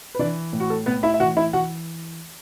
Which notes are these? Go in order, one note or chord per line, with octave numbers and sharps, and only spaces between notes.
B4
E3 D4 D5
A2
F#4
A4
A2 B3 B4
E4 E5
E5
E3 F#4 F#5
E4 E5
E3 F#4 F#5